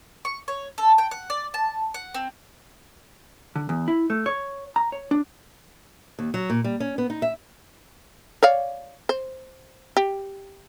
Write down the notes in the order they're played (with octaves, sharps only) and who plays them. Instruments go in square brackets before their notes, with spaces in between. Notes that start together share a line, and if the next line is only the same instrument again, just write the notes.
[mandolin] C#6
C#5
A4
G5
F#5
D5
A5
F#5
C4
[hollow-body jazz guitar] D3
E2
E4
A3
C#5
A#5
C#5
D4
[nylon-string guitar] D#2
F#3
A#2
G3
C#4
B3
D#4
E5
[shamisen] C#5 D5 F5
C5
G4